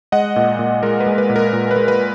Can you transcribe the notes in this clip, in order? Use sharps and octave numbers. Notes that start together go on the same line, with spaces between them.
G#3 D#5 F#5
A#2
A#2
G#3 A#4
B4
G#3
B4
A#2
A#4
A#2
B4
G#3
B4